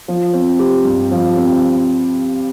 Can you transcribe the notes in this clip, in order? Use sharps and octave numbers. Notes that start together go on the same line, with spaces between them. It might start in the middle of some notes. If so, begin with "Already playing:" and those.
F3
C4
G4
G2
F3
C4